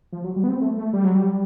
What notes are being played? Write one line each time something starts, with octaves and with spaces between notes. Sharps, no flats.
F3
F#3
G3
B3
C4
A3
A3
G3
F#3
G3